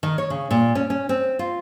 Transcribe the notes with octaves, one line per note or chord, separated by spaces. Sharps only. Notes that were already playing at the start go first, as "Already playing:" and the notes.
D#3
C#5
C#3
A#2
C#4
C#4
C4
F4